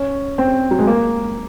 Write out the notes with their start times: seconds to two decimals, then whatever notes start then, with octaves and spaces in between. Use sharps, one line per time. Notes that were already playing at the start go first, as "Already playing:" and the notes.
Already playing: C#4
0.38 C4
0.71 F#3
0.79 G#3
0.87 A#3